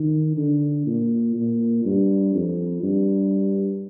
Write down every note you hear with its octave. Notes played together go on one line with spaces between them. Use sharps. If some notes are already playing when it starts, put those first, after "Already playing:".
Already playing: D#3
D3
A#2
A#2
G2
F2
G2